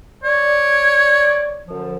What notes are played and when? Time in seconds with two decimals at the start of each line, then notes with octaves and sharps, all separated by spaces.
0.24 C#5 D5
1.67 F#2 D3 F3